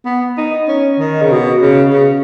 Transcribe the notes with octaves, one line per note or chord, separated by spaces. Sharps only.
B3
D#4
C#4
D#3
C#3
B2
C#3
C#3